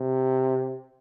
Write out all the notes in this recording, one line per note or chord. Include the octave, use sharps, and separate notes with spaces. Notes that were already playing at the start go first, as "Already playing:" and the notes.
Already playing: C3